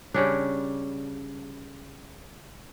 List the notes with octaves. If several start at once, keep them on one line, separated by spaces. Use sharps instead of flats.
C#3 G3 C#4 D4